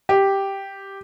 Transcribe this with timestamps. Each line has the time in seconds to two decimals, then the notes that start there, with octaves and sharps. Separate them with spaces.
0.09 G4